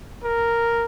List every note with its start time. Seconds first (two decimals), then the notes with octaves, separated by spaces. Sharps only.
0.24 A#4